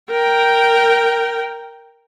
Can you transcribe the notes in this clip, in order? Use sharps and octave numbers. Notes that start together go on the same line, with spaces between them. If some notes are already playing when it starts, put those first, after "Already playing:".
A#4 G5